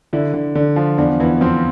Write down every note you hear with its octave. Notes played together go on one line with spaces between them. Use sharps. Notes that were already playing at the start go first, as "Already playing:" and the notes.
D3 E4
D3
D3
F3
E2 D4
E2 E3
F3 C4